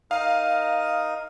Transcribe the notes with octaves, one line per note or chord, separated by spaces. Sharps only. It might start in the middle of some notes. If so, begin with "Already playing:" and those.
D#4 A#4 F5 D#6